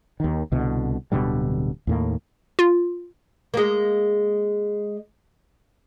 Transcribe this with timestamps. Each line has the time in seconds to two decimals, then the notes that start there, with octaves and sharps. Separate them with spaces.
0.20 D#2 D#3
0.52 C2 B2 D3
1.12 D1 B2 D3 G3
1.87 D#2 A2 A#3
2.59 F4
3.54 G#3 A#3